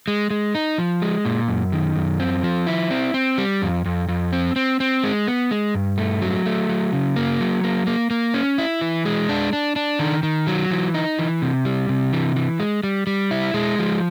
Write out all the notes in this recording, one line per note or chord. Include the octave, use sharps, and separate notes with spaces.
G#3
G#3
D#4
F3
G#3
A#2
F#2
D#3
F#2
C4
F3
E4
C4
C4
G3
F2
F2
F2
C4
C4
C4
G#3
B3
G#3
G2
A3
F#3
A3
F#3
C#3
A#3
F#3
A#3
A#3
A#3
C#4
E4
E3
G#3
D4
D4
D4
D#3
D#3
F#3
E3
D#4
E3
C3
G3
C3
E3
E3
G#3
G3
G3
E4
G#3
F3